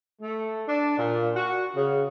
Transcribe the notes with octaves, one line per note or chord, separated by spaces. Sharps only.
A3
D4
A#2
F#4
C#3